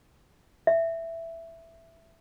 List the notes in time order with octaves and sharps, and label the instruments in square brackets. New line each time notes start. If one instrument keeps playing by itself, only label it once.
[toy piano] E5